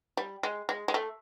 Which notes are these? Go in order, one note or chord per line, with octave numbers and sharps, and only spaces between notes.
G3
G#3
G#3
G#3
A3